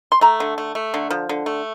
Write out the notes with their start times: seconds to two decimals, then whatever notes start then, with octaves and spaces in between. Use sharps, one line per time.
0.12 C6
0.21 A3 A#5
0.40 D3
0.58 A3
0.75 A3
0.94 D3
1.11 F3
1.29 D3
1.46 A3